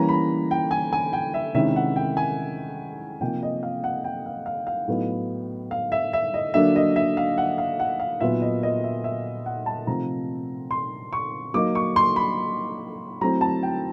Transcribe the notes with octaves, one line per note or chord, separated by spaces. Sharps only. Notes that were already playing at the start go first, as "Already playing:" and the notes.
Already playing: E3 G3 A#3 C#4 E4 A#5
B5
G5
G#5
G#5
G5
E5
C3 D#3 G#3 C#4 E4 E5
F#5
G5
G#5
C3 F3 A#3 D#4 G5
D#5
F5
F#5
G5
F5
F5
F5
A2 F#3 B3 D#4
F5
E5
E5
D#5
D3 F#3 A#3 D4 E5
D#5
E5
F5
F#5
F5
F#5
F5
A#2 F#3 B3 D#4 E5
D#5
D#5
E5
E5
F#5
A5
C3 F3 A3 C4 D#4 A#5
C6
C#6
F#3 A#3 D#4 D6
C#6
C6
B5
F#3 A3 C4 E4 A#5
A5
G5